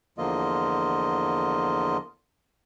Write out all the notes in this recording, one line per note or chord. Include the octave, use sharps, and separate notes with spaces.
E2 D3 F3 A#3 F4 D#5